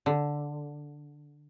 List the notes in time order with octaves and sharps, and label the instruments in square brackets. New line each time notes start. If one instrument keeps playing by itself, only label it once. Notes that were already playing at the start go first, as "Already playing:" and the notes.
[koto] D3